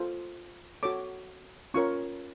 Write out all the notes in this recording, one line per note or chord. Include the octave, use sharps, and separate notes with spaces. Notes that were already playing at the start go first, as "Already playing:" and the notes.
Already playing: F4 A4 C5
F#4 A4 C#5 D6
C#4 F4 A#4 C#5 C#6